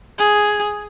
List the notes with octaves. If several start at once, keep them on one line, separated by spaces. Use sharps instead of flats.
G#4